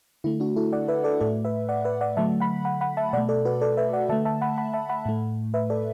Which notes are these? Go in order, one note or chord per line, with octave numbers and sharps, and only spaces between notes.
D3 A3 E4
D4 F#4
E4 A4
D5 F#5
B4 E5
A4 D5
A2 A3 A4 D5
B4 E5
D5 F#5
B4 E5
D5 F#5
D3 F#3 A3 E5 A5
F#5 B5
F#5 B5
F#5 B5
E5 A5
B2 A3 D5 F#5
A4 D5
F#4 B4
A4 D5
B4 E5
D5 F#5
D3 A3 E5 A5
E5 A5
F#5 B5
F#5 B5
E5 A5
F#5 B5
A2 A3
B4 E5
A4 D5